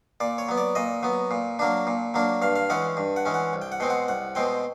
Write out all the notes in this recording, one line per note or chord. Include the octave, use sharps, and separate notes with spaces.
A#2 D5
C#5
F#3 B3
D5
A#2 D#5
F#3 B3
A#2
F#3 A#3 D4
A#2
F#3 A#3 D4
G2 F5
F5
E3 G#3 C#4 F#5
G2
F#5
E3 G#3 C#4
F#5
C2
G5
F#5
B2 G#3 C4 G5
F#5
C2 F#5
B2 G#3 C4 G5